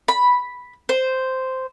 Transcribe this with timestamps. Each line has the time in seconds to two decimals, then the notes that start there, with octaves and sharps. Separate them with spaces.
0.08 B5
0.89 C5